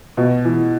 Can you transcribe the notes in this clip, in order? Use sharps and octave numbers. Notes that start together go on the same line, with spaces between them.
B2
E3